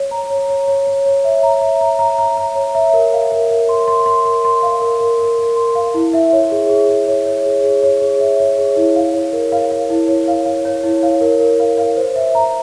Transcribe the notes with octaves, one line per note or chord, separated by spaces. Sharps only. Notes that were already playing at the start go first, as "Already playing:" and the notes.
Already playing: C#5
A#5
C#5
C#5
C#5
C#5
C#5
E5
A#5
E5
A#5
A#5
A#5
A#5
C#5
E5
A#4
F5
A#4
A#4
C6
C6
C6
A#4
C6
F5
A#4
A#4
A#4
A#4
C6
F5
E4
E5
C#5
G#4
G#4
G#4
C#5
C#5
G#4
G#4
C#5
G#4
E5
C#5
G#4
E4
F5
C#5
A#4
F5
F5
E4
C#5
F5
F5
C#5
E4
F5
A#4
A#4
F5
F5
C5
E5
A#5